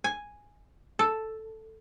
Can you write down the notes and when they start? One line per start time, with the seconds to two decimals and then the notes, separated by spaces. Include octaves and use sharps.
0.04 G#5
0.99 A4